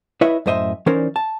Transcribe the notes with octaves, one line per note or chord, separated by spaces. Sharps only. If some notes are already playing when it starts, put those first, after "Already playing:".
E4 B4 C#5 D#5 E5
F#2 A2 C5 D#5 E5 C6
E3 C#4 D#4 A#4 C5 D5
A5